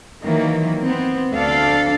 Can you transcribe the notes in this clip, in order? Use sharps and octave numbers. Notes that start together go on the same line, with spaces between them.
D#3 E3 F#3 A#3
B3 C4
D2 D4 A4 F5